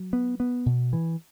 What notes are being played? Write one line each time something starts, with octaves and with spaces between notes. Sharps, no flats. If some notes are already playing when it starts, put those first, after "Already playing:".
Already playing: F#3
B3
B3
B2
E3